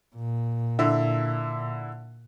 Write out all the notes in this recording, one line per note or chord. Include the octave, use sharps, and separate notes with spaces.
A#2
D3 E4